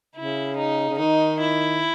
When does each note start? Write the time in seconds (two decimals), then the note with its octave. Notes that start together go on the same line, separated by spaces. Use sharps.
0.15 C#3 E4
0.57 D#4
0.89 C#3
0.98 D#3 D#4
1.40 E4